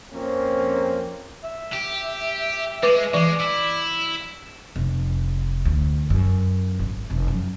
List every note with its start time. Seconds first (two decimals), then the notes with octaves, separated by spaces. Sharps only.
0.13 F2 F3 A#3 C4 C#4
1.44 E5
1.73 G4
2.83 G#3 B4 D6
3.14 E3 G#3 D5
3.40 E4
4.76 F1
5.65 D2
6.10 F#2
6.79 G#1
7.10 F1
7.28 F#2